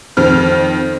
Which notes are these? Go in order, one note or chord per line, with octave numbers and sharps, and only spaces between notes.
F2 D#3 F6